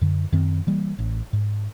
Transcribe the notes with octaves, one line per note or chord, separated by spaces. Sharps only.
F#2 D3
F#2 D#3 C4
E3 G3 A#3
A1
G#2